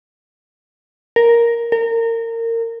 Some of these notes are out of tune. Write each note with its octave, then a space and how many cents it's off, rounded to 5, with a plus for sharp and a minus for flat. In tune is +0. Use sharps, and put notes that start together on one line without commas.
A#4 +5
A#4 -25